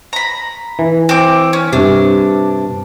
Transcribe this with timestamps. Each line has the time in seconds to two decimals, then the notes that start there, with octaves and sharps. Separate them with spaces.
0.13 A#5 B5
0.79 E3
1.09 C4 D6
1.53 C#4
1.73 G2 C3 D4